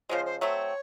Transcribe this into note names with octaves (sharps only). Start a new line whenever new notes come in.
C#3 F3 G#3 C5
C5
F#3 A3 C4 C#5